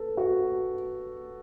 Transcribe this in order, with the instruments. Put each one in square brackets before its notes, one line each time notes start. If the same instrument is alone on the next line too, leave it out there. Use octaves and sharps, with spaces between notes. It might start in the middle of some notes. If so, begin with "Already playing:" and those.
Already playing: [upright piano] A4 B4
F#4